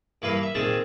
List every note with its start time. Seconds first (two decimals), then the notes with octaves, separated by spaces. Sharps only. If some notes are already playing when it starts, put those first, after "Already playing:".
0.22 G2 E3 A#3 B4 F5
0.42 E5
0.55 A#2 D#3 C4 G#4 A5